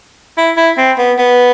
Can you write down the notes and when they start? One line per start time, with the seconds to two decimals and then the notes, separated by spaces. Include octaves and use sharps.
0.38 E4
0.57 E4
0.78 C4
0.98 B3
1.19 B3